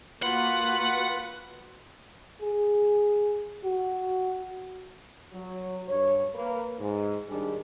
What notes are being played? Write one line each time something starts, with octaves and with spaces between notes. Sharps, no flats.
A#3 F4 F#4 B4 F#5 B5
G#4
F#4
F#3
G2 C#5
A#3 B4
G#2
D#3 G3 D4 G#4